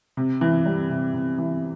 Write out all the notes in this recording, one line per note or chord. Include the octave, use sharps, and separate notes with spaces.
C3
E3
G3
C3
C3
E3